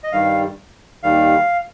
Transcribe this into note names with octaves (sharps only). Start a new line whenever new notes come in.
D#5
G2 D#3 G3 F5
D#2 D#3 G3 F5